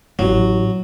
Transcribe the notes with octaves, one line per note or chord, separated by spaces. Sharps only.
A1 F#3